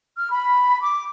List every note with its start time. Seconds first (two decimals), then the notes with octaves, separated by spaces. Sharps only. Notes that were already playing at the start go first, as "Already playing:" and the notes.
0.16 F6
0.30 B5
0.80 D6